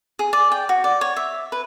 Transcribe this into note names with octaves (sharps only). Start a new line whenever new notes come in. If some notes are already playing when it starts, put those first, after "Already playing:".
G#4
D5
G5
F#4
D5
C#5
E5
B4